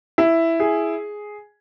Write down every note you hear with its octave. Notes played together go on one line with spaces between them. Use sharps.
E4
G#4